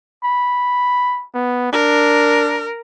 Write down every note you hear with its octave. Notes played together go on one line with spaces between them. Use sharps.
B5
B3
D4 A#4